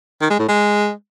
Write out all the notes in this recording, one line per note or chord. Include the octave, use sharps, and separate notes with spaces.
D#3
G#3
A2
G#3